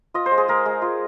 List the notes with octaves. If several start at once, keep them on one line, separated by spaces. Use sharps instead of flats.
F4 D#5
C5
G#3
G#4
G#3 A#4
G#3
F4